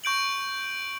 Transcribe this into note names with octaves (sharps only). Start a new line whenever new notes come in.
C#6 G6 D7 F#7